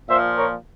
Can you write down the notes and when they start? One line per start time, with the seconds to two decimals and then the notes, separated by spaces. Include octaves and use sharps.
0.09 A#2 F3 C5 E5
0.37 A#4 C#5